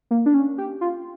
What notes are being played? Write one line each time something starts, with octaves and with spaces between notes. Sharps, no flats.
A#3
D4
C#4
G4
F4